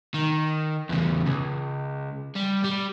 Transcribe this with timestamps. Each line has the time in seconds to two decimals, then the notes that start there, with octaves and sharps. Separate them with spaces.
0.14 D#3
0.89 E2 C#3
1.26 C#2
2.35 G3
2.64 G3